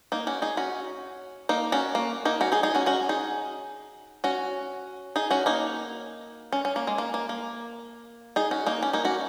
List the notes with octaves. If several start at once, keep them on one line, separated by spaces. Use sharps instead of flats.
A#3 D#4
C#4 F#4
D#4 G#4
C#4 F#4
A#3 D#4
C#4 F#4
A#3
A#3 D#4
C#4 F#4
D#4 G#4
D#4 G#4
C#4 F#4
C#4 F#4
D#4 G#4
C#4 F#4
D#4 G#4
C#4 F#4
A#3 D#4
C#4
C#4
A#3
G#3
A#3
A#3
A#3
D#4 G#4
C#4 F#4
A#3 D#4
C#4
A#3 D#4
C#4 F#4